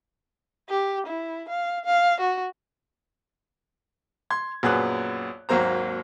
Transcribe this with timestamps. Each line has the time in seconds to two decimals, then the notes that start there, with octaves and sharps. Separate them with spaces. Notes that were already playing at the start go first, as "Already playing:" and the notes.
0.69 G4
1.07 E4
1.49 F5
1.85 F5
2.20 F#4
4.30 C6 G#6
4.63 A#1 F#2 B3 G#4 F#6
5.49 G#1 D#2 F#3 A#3 C5 A#5